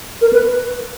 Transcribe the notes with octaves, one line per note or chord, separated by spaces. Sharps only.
A#4
B4